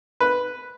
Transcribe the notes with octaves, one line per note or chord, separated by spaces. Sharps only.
B4